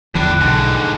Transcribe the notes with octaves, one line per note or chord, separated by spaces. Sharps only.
E2 A2 D3 F3 D4 F#6
B1 G#2 D3